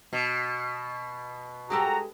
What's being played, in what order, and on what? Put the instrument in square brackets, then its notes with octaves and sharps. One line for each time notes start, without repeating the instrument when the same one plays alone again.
[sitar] B2
[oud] G#3 G4 A4 [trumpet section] F#4 A#5